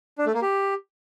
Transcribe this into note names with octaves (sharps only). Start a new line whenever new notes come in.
D4
A3
A#3
G4